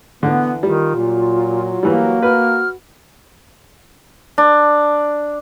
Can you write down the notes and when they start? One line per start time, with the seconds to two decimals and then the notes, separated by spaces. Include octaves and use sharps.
0.23 D3 E3 B3
0.63 D#3 G3 F4
0.95 A#2 F#3
1.83 E3 G3 A#3 F#4
2.23 F#4 B4 F6
4.38 D4